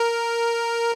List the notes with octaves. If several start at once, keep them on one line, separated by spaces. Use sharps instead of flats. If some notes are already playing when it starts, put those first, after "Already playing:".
Already playing: A#4